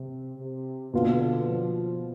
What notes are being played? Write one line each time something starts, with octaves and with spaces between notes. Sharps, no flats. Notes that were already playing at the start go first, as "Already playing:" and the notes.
Already playing: C3
C3
B2 D3 B3 F4
F3